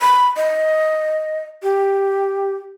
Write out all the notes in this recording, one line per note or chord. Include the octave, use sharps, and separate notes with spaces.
B5
D#5
G4